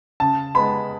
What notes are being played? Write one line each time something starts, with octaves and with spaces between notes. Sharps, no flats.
C#3 A5
G#3 B3 B5